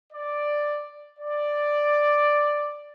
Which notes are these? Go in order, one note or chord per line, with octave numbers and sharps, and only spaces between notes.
D5
D5